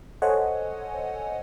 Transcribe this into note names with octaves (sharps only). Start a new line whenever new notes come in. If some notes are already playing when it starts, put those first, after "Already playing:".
A4 C5 C#5 D#5 F#5 G#5